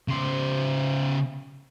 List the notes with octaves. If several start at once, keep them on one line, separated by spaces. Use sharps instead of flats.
C#3 C5